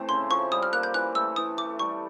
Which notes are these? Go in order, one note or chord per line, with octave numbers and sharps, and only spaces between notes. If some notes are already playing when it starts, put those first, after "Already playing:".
Already playing: A2 E3 A3 C4
C#3 C6
F3 C#6
G3 D#6
F6
A#3 F#6
G6
E3 F#6
A3 E6
E3 D#6
A3 D6
G3 C#6